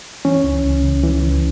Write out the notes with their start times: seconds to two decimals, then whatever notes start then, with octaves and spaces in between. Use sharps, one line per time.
0.25 E3 C#4
0.44 C#2
0.65 C#2
0.83 C#3
1.03 E3
1.23 C#2